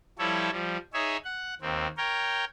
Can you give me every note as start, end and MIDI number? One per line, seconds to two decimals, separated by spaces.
0.19 0.51 53
0.19 0.51 55
0.19 0.51 64
0.19 0.51 69
0.19 0.51 73
0.52 0.77 53
0.52 0.77 55
0.94 1.17 63
0.94 1.17 68
0.94 1.17 73
0.94 1.17 76
1.24 1.54 78
1.61 1.87 39
1.61 1.87 60
1.97 2.45 70
1.97 2.45 73
1.97 2.45 79